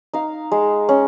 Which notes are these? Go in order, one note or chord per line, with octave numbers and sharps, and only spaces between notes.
D#4 F5
G#3
C#4